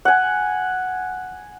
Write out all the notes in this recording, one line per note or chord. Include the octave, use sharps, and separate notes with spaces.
F#5 G#5